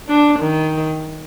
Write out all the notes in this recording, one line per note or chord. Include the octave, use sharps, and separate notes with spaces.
D4
D#3